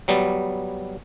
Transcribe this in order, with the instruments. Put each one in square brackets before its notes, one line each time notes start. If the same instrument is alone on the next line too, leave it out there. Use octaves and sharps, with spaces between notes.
[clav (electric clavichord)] F#3 G3 B3